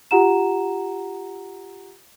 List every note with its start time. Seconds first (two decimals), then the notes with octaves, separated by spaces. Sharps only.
0.11 F4 G4 F#5 A#5 E7